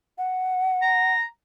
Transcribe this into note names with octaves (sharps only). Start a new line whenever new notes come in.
F#5
A#5